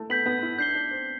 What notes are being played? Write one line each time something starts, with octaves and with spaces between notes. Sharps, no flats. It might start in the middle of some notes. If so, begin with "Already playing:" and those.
Already playing: A3 E4
B3 G6 B6 F#7
B3
E4
D4 G6 C7 G7
D4
C4